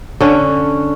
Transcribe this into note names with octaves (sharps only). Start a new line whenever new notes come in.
D3 C#4